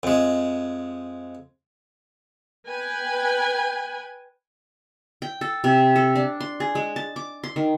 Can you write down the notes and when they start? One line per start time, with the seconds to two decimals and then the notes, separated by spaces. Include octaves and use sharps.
0.03 F2 G#3
2.69 B4 G5 G#5
5.22 G5
5.41 A4
5.64 C3
5.96 A4
6.16 D4
6.40 C6
6.60 G#4
6.75 G#3
6.96 A5
7.16 D6
7.44 C6
7.56 D#3